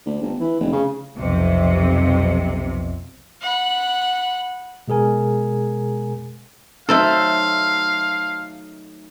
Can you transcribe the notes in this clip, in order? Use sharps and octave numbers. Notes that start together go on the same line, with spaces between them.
D2
G1
E3
F1
C#3
B1 F2 C3
F#5 B5
B2 G#3 G#4 A#4 G#5
F#3 A3 D#4 A4 C5 E5 F5